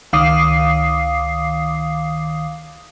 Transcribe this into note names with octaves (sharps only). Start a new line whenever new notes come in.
C#2 D#3 F5 D6 D#6 C7